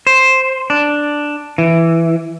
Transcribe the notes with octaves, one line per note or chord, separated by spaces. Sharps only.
C5
D4
E3